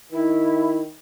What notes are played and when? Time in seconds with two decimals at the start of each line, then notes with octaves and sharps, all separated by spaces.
0.12 D#3 E4